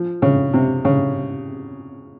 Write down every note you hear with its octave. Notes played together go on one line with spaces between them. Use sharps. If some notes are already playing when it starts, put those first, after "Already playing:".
Already playing: F3
C#3
C3
C#3